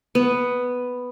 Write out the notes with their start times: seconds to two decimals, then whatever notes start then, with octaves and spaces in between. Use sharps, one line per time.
0.15 B3